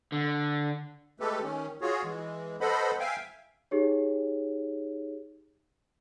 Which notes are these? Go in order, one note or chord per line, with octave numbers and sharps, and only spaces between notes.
D3
G#3 A3 G4 A4 B4
D#3 C#4
F4 F#4 G#4 C#5
E3 G#3
A4 B4 C5 D#5 F#5 B5
E5 F5 G5 G#5
D#4 G4 G#4 C#5